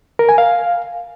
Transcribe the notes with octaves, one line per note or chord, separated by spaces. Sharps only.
A#4
G#5
F5